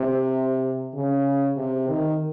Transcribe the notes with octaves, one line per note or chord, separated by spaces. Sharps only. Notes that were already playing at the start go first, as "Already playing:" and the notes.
Already playing: C3
C#3
C3
D#3